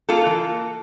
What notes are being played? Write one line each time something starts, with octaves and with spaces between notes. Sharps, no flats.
A#3 F4 A4
E3